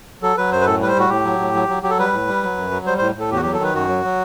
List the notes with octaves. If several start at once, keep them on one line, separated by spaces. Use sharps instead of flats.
F#3 A4
F#3 B4
F#2 C5
B4
A2 A4
G3 B4
C5
A2 F#4
A2 G4
F#3
A2
F#3
F#3
F#3 G4
A4
G3 B4
A2
G3
F#3
F#2
F#3
G3 C5
A2 C5
A2 A4
E2 G4
F#4
F#3 G4
A4
D#3 B4
F#2 F#4
F#3
F#3